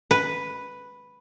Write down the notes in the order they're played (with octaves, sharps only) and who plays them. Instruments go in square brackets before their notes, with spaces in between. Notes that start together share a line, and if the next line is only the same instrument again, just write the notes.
[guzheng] B4